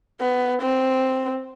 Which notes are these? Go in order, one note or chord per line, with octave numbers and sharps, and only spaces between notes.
B3
C4